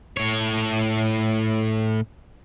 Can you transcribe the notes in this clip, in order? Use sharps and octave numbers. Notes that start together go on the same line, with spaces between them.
A2 C#5